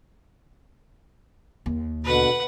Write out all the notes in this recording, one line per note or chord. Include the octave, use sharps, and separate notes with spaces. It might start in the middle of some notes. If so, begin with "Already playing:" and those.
D#2
B2 D3 B4 F#5